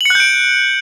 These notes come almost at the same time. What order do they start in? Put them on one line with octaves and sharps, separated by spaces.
F#7 C#7 F#6 G6 D7